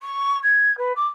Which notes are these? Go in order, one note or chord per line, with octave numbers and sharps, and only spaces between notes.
C#6
G#6
B4
D6